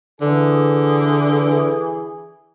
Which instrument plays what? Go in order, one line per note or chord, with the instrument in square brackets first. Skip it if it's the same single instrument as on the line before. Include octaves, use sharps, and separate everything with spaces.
[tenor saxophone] D3 [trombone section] E3 G#4